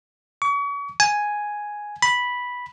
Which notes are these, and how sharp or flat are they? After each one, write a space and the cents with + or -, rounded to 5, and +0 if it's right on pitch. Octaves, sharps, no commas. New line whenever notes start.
C#6 +40
G#5 +0
B5 -5